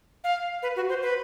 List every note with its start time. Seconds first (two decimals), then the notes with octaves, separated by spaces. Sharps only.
0.24 F5
0.63 B4
0.76 F#4
0.89 C5
1.02 B4